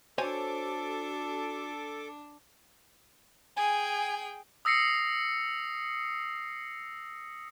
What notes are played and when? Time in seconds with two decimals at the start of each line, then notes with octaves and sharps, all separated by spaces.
0.18 D4 F#4 A4 C5 C#5 G#5 D6
3.57 G#4 G5 G#5
4.65 D#6 E6 A#6 C7 C#7